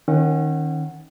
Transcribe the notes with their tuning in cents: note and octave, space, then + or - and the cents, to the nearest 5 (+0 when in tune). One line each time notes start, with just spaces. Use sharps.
D#3 +0 C#4 -30 F#5 -5